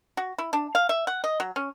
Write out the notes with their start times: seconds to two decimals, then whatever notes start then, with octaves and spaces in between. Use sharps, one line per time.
0.17 F#4
0.38 E4
0.53 D4
0.75 F5
0.89 E5
1.07 F#5
1.24 D#5
1.40 F#3
1.56 C#4